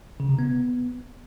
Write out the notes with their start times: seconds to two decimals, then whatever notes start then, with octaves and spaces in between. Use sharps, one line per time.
0.20 C#3
0.29 C3
0.39 B3